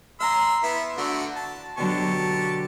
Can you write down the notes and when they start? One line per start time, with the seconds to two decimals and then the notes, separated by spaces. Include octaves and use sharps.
0.20 F5 A#5 C6 E6
0.63 B3 E4 E5
0.98 D3 A3 F#4
1.36 A5
1.78 B2 D3 F#3 G4 A5 C#6